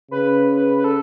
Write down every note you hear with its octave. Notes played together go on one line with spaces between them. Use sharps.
C#3 B4
B4
B4
A4